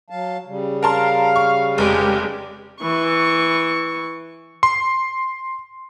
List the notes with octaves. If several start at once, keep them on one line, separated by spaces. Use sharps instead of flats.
F#3 F5 A5
C#3 G3
A#4 F5 A5 C6
C#6
F1 G#3 G4
E3 C#6
C6